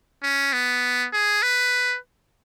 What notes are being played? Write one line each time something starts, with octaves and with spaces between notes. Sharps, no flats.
C#4
B3
G#4
B4